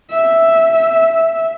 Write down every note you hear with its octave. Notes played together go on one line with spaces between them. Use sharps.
E5